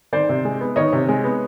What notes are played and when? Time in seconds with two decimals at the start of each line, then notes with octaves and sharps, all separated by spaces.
0.13 D#3 C5 D5
0.29 C3
0.45 G#3
0.61 B3
0.76 D#3 C#5 D#5
0.93 C3
1.08 G#3
1.24 B3